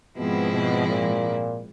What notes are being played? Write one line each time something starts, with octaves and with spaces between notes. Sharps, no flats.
G#2 B2 F3 G#3 C4 E4
B2
A#2